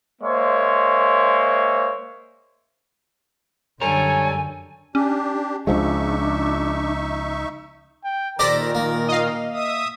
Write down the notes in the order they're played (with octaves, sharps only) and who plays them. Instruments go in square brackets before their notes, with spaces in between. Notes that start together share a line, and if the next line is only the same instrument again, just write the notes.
[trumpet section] G#3 A#3 C5 C#5 E5
[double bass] F#2 D3 [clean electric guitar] G3 A#4 [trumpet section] A4 C#5 [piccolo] G#5
[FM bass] C#4 [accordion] D4 G4
[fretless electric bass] C#2 F3 G#3 [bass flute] D4 [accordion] D#4 E5 C#6
[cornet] G5
[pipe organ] A#2 D#3 [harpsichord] G4 A4 C5 [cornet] A#4 [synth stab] D5 A#6
[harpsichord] A#3
[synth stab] D#5 F5
[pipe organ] E5 D#6